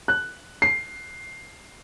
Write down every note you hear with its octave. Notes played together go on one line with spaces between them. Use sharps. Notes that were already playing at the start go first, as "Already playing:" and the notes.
F#6
C7